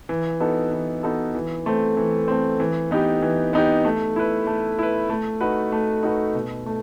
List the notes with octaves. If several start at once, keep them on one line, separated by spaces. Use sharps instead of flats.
E3
B3 D#4 F#4 A4
E3
B3 D#4 F#4 A4
E3
A3 C4
E3
A3 C4
E3
B3 D#4 G4
E3
B3 D#4 G4
A3
E4 B4
A3
E4 B4
A3
D#4 F#4 B4
A3
D#4 F#4 B4
B2
A3